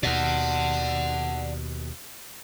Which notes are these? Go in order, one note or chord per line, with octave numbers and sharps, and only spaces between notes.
D#2 B2 D5 F#5